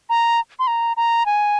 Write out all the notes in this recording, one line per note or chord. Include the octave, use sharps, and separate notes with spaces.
A#5
C6
A#5
A#5
G#5